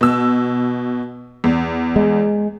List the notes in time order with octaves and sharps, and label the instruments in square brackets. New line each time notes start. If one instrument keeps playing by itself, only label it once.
[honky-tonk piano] B2 E6
E2
[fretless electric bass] G#3